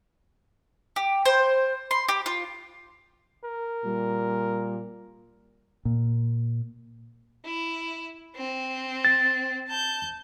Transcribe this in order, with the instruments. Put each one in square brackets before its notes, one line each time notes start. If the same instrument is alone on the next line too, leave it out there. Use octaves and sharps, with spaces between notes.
[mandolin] G4
C5
C6
G4
F4
[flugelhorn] A#4
[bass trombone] A#2 [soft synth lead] G3
[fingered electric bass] A#2
[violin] E4
C4
[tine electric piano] A6
[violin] A5 G6